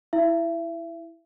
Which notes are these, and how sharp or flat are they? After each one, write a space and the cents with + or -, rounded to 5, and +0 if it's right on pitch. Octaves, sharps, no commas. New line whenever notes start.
E4 +0 E5 +30